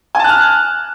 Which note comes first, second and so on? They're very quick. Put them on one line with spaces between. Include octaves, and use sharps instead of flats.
G#5 A5 F#6 F6